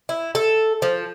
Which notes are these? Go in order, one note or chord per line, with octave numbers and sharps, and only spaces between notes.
E4
A4
F3